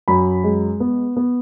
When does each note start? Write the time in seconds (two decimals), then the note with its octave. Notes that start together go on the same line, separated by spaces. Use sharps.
0.08 F#2 B5
0.44 G#3
0.80 B3
1.17 B3